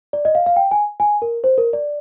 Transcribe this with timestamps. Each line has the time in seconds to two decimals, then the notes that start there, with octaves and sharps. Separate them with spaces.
0.13 D5
0.25 D#5
0.35 F5
0.46 F5
0.56 G5
0.71 G#5
1.00 G#5
1.22 A#4
1.44 C5
1.58 A#4
1.73 D5